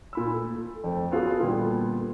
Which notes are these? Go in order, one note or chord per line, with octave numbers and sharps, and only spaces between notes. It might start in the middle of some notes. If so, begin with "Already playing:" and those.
A#2 B5 E6
A3
F2 A3
B3 C#4 F4 F#4 G#4 A4
A#2 D3 G3 B3